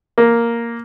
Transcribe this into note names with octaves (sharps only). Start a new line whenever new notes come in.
A#3